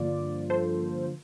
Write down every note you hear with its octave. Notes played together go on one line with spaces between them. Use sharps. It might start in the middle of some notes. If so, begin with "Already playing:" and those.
Already playing: G2 D3 F3 A#3 F4 D5
A4 C5